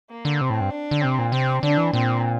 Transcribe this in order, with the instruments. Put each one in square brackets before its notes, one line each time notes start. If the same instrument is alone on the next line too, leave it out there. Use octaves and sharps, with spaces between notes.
[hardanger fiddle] A#3
[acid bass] D3
[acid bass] C3 [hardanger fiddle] C4
[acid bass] A2
G2
[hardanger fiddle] D4
[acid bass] D3
[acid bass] C3 [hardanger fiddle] C4
[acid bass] A#2
[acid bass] C3 [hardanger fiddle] C4
[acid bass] D3 [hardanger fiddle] D4
[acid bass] E3
[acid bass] A#2 [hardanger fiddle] C4